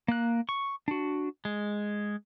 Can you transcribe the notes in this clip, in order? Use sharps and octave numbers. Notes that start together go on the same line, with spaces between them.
A#3 F#6
C#6
D4 F#4
G#3